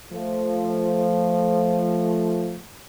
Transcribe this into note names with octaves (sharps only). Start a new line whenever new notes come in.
F3 A3